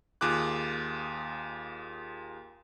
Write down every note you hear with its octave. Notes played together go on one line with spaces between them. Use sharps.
D#2 F4 G#4 D6 F#6